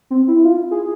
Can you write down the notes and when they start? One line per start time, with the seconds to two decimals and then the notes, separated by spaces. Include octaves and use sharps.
0.10 C4
0.28 E4
0.39 E4
0.45 F4
0.71 G#4